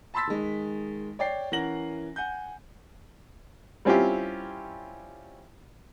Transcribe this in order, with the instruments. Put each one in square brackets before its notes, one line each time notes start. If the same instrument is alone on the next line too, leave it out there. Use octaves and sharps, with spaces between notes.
[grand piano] A5 B5 C6 E6 A6 B6
D#3 G#3
C#5 D5 G5 C7
E3 C#4 A#4 F#5 A#6 F#7
F#5 G#5 G6
[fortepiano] G3 C4 C#4 E4 F4 G4